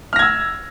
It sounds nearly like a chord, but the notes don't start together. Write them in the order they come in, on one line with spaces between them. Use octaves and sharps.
F6 A#6 G#6 E6